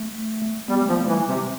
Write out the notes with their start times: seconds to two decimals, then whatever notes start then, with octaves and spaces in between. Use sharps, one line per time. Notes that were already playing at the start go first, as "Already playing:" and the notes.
Already playing: A3
0.68 G3 B3
0.82 A3
0.88 F3 B3
0.95 A3
1.08 E3 G3
1.28 C3